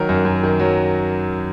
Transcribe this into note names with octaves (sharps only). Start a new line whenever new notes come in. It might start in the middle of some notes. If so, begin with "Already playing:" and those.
Already playing: D#3 F#3 A#4
F#2
F#2
D#3
F#3